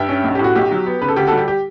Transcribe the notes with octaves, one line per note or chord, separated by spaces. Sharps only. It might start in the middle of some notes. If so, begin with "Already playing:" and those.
Already playing: G2 E5 G5
C#4
B1
A2 G4
F#4
B1 G4
F#3
B3
C#3 B4
A4
D2 G4
G3 F#4 A4
G4
G4